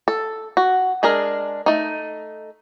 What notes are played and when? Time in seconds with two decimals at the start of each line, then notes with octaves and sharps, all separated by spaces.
0.08 A4
0.57 F#4
1.03 G#3 D4 G#4 A#4
1.66 A3 D#4